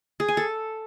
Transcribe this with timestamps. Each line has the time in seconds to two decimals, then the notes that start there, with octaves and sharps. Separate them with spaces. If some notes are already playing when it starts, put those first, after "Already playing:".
0.20 G#4
0.28 G#5
0.37 A4